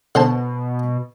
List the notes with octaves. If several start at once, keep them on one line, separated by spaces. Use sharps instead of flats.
B2 D3 C5 A5